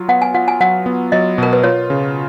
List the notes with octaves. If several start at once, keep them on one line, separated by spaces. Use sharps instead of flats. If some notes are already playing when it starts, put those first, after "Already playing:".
Already playing: F#3 F4
B3 F#5
G#5
F4 F#5
G#5
F#3 F#5
B3
F#3 D#5
B2 A#4
B4
F4 C#5
C#3